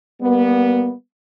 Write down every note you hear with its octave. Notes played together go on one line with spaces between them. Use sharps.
G3 A#3 B3